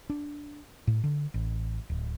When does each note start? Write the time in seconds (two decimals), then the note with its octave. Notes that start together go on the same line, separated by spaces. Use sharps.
0.10 D4
0.87 A2
1.04 D3
1.34 A1
1.90 D1